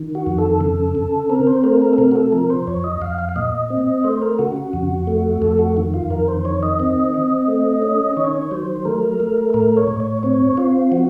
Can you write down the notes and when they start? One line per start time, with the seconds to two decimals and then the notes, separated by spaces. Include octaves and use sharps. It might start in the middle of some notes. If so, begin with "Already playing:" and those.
Already playing: D#3
0.15 F#4
0.27 F2
0.38 A4
0.61 C#3
0.95 C#3
1.29 C4 A#4
1.47 C5
1.64 A3 A#4
1.82 A#4
1.93 A4
1.98 C3 A#4
2.11 F#4
2.16 A4
2.32 F3 A#4
2.50 C5
2.67 F2 C#5
2.84 D#5
3.01 F2 F5
3.18 F5
3.29 F5
3.36 A#2 D#5
3.70 C4
4.04 A3 C5
4.22 A#4
4.39 C#3 F#4
4.56 F#4
4.73 F2
5.07 A3
5.42 F2 A4
5.59 F#4
5.77 D#3
5.94 F4
6.10 F2 A#4
6.28 C5
6.45 D#3 C#5
6.63 D#5
6.80 C4
7.14 C4
7.48 A3
7.82 C#4
8.17 D#3 C#5
8.51 F#3 C5
8.85 A3 A#4
9.20 A3
9.54 A2 A#4
9.77 C#5
9.88 A2
10.00 C#5
10.23 C4 C#5
10.57 C4 F4
10.92 F3 F#4